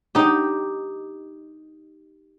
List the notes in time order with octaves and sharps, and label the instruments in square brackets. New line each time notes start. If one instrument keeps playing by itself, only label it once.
[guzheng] D#4 G4